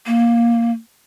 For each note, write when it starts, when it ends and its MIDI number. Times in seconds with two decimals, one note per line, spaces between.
0.06 0.71 58